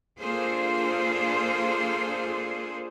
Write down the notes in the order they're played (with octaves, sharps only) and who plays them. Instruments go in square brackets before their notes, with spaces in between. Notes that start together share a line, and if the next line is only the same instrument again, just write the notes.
[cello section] A#3 D4 F4 G#4 A4 C5